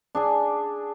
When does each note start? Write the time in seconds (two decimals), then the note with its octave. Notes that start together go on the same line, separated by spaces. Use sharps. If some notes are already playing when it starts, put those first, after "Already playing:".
0.15 D4 G#4 D5